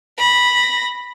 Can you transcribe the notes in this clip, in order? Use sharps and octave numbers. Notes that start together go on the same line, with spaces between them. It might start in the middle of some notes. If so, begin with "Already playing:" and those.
B5 A#6